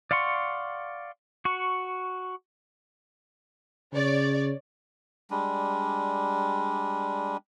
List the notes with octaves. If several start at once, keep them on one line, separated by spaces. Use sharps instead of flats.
D5 F5 F#5 C6 C#6
F#4 C#6
C#3 C#5 D5
G3 G#3 D4